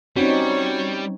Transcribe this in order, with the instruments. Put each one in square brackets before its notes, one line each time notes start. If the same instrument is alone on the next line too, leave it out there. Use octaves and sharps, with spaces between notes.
[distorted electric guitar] G3 [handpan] C4 C#4 D#4 [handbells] F#4 [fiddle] C#5